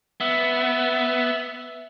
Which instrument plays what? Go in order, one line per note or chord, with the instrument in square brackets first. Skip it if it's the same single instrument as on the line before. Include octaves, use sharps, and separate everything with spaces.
[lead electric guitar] B3 [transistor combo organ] E5